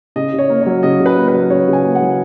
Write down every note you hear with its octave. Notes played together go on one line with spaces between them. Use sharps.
C#3 D#5
C#3 C#5
A#3
C#5
F#3
C#3 D#5
C#3
B4
A#3
B4
F#3
C#3 C#5
C#3
G#5
A#3
F#5
F#3